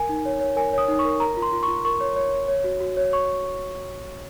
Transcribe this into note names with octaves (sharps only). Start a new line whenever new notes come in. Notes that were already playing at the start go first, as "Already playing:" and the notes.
Already playing: A#4 G#5
D#4
C#5
C#5
A#4 G#5
C#5 D#6
D#4
C#6
A#4
A#4 A#5
F4
C6
F4
C#6
F4
A#4 C#6
C#5
C#5
C#5
C#5
F#4
F#4
C#5
C#5 C#6